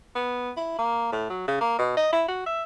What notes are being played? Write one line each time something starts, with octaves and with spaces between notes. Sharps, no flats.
B3
E4
A#3
A2
F#3
C#3
A#3
B2
D#5
E4
F#4
E5